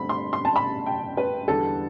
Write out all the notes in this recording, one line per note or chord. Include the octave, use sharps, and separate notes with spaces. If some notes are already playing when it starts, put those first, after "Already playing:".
Already playing: G2 D3 A3 C4 B5
C6
C6
A5
B5
G5
B4
E2 D3 G3 A4